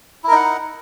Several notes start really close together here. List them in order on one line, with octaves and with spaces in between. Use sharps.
E4 A#4 D#4 F#5